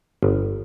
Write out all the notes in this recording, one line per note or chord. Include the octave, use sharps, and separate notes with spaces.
G1